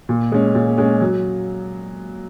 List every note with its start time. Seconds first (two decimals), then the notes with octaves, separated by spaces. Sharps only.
0.09 A#2
0.32 G#3 C#4
0.55 A#2
0.78 G#3 C#4
1.01 F#3